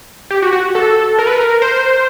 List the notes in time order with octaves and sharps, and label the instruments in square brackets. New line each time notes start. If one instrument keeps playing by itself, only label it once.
[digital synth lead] G4
F#4
F#4
A4
A#4
B4
A#4
C5